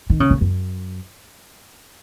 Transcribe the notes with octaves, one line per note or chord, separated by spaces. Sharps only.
D#3
C#3
F#2
F#2